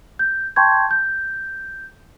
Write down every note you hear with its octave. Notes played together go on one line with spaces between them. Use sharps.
G6
G5 A5 C6 C#6 G6 G#6
G6